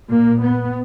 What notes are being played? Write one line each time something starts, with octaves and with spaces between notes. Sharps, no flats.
A#2 A#3
B3